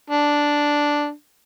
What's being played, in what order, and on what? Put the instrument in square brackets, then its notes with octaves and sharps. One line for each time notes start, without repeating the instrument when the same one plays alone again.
[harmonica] D4